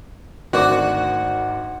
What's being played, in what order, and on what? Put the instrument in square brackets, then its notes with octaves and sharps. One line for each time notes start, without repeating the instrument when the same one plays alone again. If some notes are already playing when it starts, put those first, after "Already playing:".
[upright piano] G#1 A#4 C5 [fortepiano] D2 D5 D6 [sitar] F#4